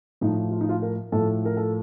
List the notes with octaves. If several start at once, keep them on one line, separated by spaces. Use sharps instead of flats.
A2 F3 D#4
F4
D#4
F4
A#4
A2 F3 A4
A#4
A4